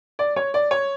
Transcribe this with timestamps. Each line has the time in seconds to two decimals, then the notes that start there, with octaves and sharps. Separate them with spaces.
0.19 D5
0.36 C#5
0.54 D5
0.71 C#5